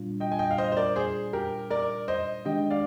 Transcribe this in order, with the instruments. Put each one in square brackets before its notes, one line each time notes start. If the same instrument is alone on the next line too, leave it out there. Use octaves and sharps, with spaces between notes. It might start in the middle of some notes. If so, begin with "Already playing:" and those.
Already playing: [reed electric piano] A#2 G3 D4 F4
[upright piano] D#5 G5
G#5
D#5 G5
F5
C5 D#5
C5
A#4 D5
G#4 C5
G4 A#4
A#4 D5
C5 D#5
[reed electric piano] D#3 G#3 D4 G4 [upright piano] D#5 G5
[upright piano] D5 F5